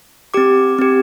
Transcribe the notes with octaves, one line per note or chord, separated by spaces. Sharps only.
C4 G4 D6
C4 G4